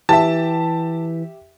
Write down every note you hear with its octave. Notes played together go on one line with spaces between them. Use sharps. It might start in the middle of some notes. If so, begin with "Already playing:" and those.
E3 G4 E5 A5